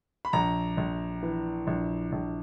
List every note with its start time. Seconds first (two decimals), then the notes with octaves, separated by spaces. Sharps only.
0.25 B5
0.33 A#1 A#5
0.77 A#1
1.23 E3
1.67 A#1
2.12 A#1